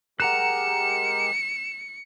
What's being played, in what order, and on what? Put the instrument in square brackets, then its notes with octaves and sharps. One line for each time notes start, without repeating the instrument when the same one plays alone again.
[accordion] G#3 G4 A#4 [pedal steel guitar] F#5 A#5 F#6 [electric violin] C#7 [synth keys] E7